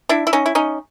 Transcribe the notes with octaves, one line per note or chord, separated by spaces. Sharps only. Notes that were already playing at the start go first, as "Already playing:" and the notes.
D4 E4
E4
C#4 D#4
E4
C#4 D#4